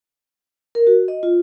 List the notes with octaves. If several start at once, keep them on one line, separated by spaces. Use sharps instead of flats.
A#4
F#4
D#5
F4